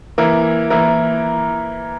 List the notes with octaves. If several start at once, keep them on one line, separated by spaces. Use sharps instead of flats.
E3 A#3 E4 A#4
E3 A#3 E4 A#4